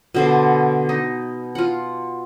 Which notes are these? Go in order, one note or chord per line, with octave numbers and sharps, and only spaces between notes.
B2 D3 C5
D#4
F4 F#5